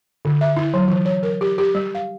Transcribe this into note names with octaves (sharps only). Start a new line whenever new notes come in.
D3
E5
E4
F#3
E3
C#5
A#4
G4
G4
G3
F5